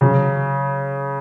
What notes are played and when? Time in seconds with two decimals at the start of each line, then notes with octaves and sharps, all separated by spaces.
0.01 C#3 F#3